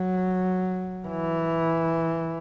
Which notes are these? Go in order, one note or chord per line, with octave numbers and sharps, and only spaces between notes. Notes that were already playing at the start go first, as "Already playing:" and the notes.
Already playing: F#3
E3